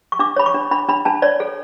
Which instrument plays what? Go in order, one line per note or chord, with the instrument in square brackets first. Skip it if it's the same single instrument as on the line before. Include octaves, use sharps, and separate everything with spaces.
[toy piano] C#6
D4 D6
C#5 B5
C#6
D4
D4 B5
D4 B5
D4 A5
C#5 D5
A4